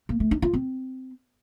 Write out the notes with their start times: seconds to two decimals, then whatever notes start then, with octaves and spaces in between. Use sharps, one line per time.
0.09 A#3
0.20 A3
0.31 D#4
0.42 F4
0.53 C4